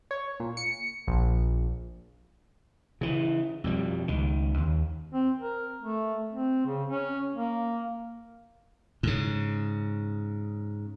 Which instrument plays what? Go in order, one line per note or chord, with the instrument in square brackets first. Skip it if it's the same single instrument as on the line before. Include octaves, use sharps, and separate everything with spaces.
[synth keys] C#5
A#2
C#7
A#1
[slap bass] C#3 E3
F2 B2 G3
C#2 D#3
D#2
[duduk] C4
A#4
A3
C4
C#3
C#4
A#3
[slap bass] G#2 C#3